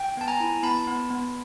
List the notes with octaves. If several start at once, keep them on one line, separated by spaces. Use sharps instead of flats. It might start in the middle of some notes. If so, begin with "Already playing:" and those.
Already playing: G5
B3 A5
G#5 A#5
E4
B3 A5 B5
B3
B3